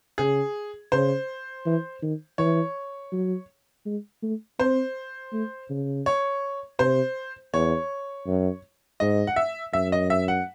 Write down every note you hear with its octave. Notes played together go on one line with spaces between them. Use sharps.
C#3 G#4
C#3 C5
E3
D#3
E3 C#5
F#3
G#3
A3
C4 C5
A3
C#3
C#5
C3 C5
E2 C#5
F#2
G#2 D#5
F#5
E5
F#2 E5
D#5
E5
F#5